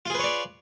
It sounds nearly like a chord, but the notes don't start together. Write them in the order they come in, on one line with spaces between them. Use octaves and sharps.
F4 G#4 B4 C#5 D5